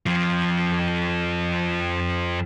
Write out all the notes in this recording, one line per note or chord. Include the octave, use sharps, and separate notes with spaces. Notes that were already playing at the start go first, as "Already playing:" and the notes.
F2 F3